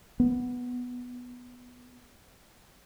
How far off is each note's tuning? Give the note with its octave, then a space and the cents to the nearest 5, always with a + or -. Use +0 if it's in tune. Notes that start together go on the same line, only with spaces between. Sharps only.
B3 +0